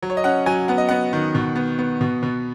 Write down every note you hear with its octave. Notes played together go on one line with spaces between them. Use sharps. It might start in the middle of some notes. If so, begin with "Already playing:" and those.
F#3
C#5
D#5
C#4 F#5
F#3 G#5
B3 F#5
D#5
B3 F#5
D#3
B2
B3
B3
B2
B2